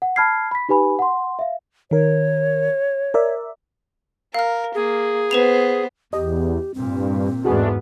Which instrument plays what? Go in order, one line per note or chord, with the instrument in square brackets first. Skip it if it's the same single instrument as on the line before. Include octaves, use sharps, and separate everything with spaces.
[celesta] F#5
A5 B5 F6 G#6 C7
B5 B6
D#4 G4 B4 G#5 B5
F#5 C6
E5 F5
[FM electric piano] D#3 A#4 [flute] C#5
[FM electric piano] A#4 D5 E5
[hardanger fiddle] A#4 [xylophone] F5 F6
[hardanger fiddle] A#3 [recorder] G#4
[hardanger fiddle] B3 C5 [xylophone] B4 E7 F7
[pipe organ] E2 [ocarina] G4 [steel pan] D#5
[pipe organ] G2 [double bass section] A#2 [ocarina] C4
[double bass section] E2 G#2 B3 [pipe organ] G#3 A3 D4 [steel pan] F#4 G#4